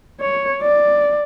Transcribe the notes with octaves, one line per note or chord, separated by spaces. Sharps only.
C#5
D5